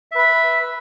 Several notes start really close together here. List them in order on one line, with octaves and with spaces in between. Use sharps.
E5 B4 B5